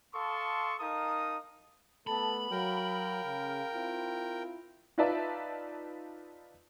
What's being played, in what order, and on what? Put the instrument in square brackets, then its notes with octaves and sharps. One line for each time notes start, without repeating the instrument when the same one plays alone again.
[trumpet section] A4 F5 A5 C6 C#6 D#6
D#4 A#4 F5 A5 D#6
[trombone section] A3 B3 A4 [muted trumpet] A5 [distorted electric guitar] B5
[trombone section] F#3 [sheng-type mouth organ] A#4 G5 [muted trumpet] F5
[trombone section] C#3
C4 E4 F4
[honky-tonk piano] D#4 F4 B4 D5 E5 A5